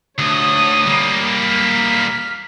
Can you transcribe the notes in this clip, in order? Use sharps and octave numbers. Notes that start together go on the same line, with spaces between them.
D2 C#5 D#6
G3 A#3
F6 B6